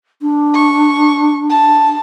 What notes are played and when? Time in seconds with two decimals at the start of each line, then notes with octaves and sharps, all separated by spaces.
0.22 D4
0.55 C#6
1.50 A5